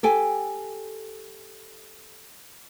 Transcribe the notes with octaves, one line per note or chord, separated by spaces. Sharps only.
G4 A4 G5 G#5